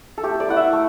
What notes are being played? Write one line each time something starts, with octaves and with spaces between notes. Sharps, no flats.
A4
A3 G4
D5
E4 F#5
E5
A3